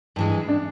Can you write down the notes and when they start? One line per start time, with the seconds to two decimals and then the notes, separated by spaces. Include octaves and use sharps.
0.16 G2 E3 G#3
0.48 D4